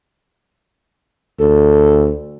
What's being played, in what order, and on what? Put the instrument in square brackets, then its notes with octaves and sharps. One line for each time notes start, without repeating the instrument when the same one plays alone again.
[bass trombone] D2 [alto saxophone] A4